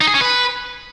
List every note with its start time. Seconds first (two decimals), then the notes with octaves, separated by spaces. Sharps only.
0.01 D#4
0.08 G#4
0.14 C#4
0.21 B4